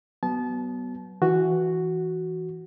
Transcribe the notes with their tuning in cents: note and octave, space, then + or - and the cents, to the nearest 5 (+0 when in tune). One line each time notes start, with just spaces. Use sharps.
F#3 +30 B3 +0 A5 -30
E3 +0 F#4 +0